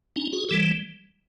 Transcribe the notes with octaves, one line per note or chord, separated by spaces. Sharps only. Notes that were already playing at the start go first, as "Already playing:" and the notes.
C#4 D#4
F#4 G#4
E3 G3 G4 A4